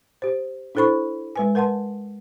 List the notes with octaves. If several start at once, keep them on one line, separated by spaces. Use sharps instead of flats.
G4 C5
D4 E4 A4 C5 B5 C#6
G#3 B4 G#5
A#4 B4 F#5 A5 C6